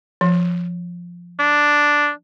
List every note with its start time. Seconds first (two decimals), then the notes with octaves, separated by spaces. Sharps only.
0.21 F3
1.39 D4